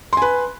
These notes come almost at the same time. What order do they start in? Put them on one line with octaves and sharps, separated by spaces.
C6 G#5 B4